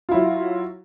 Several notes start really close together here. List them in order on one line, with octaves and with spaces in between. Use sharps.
F4 E4 F#3